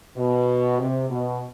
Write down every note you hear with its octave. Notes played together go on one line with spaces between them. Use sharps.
B2
C3
B2